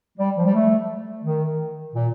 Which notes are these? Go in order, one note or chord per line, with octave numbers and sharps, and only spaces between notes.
G3
F3
G3
A3
D#3
A#2